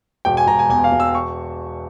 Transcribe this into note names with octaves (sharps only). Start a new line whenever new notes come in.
E1 G5
G#5
E1 A#5
G#5
E2 G#5
F5
E1
E6
C#6